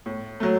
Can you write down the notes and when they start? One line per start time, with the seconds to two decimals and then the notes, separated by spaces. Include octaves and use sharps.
0.06 A2
0.40 F#3 A3